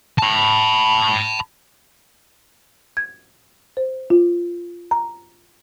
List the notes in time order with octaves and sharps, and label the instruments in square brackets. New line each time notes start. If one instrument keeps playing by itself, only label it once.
[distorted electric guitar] A5 B5
[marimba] G#6
C5
F4
A#5